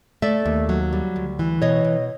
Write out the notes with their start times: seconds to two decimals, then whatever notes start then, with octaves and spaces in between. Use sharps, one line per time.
0.22 A3 D5 E5
0.45 D#2
0.69 F#3
0.93 G3
1.16 D2
1.39 E3
1.62 B2 C#5 D#5
1.85 B2